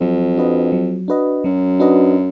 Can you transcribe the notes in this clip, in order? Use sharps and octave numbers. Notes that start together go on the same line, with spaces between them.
F2 F#3
D4 F#4 B4 D#5
F#3
D4 F#4 B4 D#5
F#2 F#3
D4 F#4 B4 D#5